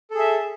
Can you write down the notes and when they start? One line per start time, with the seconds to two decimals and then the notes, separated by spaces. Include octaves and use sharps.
0.10 A4
0.15 G#4
0.19 E5